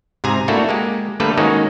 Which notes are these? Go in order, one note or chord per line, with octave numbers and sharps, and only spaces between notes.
G#2 C3 G#4 G#5 A#5
A3 A#3 D4 E4 F#4 A4
G#3 A#3 G4
D3 G3 A3 A#3 A4 B4
D#3 G#3 A#3 C#4 D#4 F#4